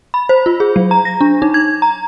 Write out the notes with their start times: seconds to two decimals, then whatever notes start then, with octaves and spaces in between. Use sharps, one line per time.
0.14 B5
0.29 C5
0.46 F4
0.60 G#4
0.76 F#3
0.91 A#5
1.05 A#6
1.21 D4
1.42 D#4
1.54 G#6
1.82 A#5